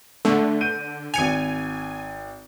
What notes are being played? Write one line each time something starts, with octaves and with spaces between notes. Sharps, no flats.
D3 A3
G6 D7 D#7
G#1 G#5 C#7 F7